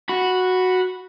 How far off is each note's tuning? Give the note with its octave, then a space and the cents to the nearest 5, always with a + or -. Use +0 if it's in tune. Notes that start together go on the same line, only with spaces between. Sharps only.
F#4 -5 B5 +0